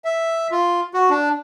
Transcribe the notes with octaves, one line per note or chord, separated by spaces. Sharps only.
E5
F4
F#4
D4